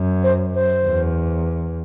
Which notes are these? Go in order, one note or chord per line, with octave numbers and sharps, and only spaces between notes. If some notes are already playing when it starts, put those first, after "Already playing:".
Already playing: F#2
C5
C5
E2